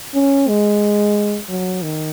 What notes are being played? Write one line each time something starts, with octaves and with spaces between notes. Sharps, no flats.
C#4
G#3
F#3
D#3